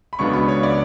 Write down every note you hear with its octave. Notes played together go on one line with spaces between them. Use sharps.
B5
C#2 C#3 F#3 B3 D4 C#6
B5
C#5
D5